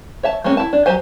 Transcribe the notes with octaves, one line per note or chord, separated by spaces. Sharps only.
C#5 E5 A5
G#3 A#3 C4 C#4
E4 A5
D4
F#3 G4 C5 G#5